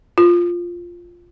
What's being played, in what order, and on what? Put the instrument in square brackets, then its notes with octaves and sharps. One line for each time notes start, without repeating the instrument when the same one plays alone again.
[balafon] F4